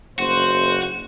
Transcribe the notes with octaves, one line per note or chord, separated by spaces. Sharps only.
F#1 F#4 C5